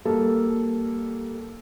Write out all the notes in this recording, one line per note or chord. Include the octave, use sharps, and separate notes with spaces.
G3 A#3 A4